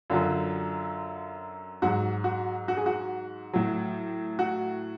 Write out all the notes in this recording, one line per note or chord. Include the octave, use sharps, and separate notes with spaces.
F#2 D3 F#3 F4
G#2 F#3 F#4
F#4
F#4
G#4
F#4
A2 F#3
F#4